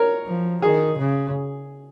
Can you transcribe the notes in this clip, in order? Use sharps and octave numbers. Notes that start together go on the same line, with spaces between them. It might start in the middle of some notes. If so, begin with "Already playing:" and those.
Already playing: A#4 C#5
F3
D#3 G#4
C#3